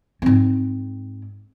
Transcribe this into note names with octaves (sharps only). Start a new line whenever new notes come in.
G#2 C4